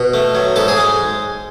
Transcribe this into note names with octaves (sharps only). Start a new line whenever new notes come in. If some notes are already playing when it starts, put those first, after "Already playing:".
Already playing: B2
A3
F#3
G#2 A4
G#4
G#3